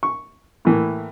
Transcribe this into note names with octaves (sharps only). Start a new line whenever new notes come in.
C#6
A2 E3 A#3